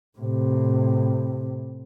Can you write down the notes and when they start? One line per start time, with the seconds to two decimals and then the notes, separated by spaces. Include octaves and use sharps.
0.18 A2 C3